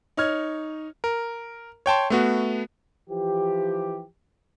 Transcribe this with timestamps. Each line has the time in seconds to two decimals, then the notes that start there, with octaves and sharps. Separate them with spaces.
0.17 D#4 C#5 F6 G#6
1.04 A#4
1.86 C#5 G5 A5 C6
2.10 A3 B3 F#4
3.10 E3 F3 G4